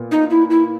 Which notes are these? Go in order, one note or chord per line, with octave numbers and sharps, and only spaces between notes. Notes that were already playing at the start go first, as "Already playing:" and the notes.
Already playing: A#2 B3
D#4
E4
E4